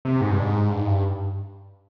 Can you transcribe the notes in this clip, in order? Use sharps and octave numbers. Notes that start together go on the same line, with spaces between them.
C3
G#2
G2
G#2
G2
G#2
G2